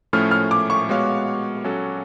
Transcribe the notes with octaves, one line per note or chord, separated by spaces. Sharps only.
A2 F3 A3 C#4 F6
F6
D6
C#6
G#3 B3 F#4 C#5 F5
F#3 C#4 F#4 A4